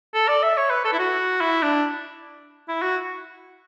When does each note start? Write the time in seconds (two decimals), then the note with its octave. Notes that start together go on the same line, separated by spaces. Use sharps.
0.14 A4
0.28 D5
0.43 E5
0.57 C#5
0.70 B4
0.85 A4
0.93 E4
0.99 F#4
1.41 E4
1.62 D4
2.68 E4
2.82 F#4